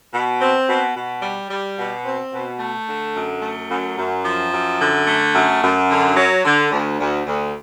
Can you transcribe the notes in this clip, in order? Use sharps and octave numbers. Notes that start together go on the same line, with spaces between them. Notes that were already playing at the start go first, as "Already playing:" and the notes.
B2
C4
B2
B2
G3
G3
B2
C4
B2
A3
D3
F#2
A3
F#2
F#2
F3
F#2
D3
A3
F#2
F#2
D3
F#3
D3
D2
D2
D2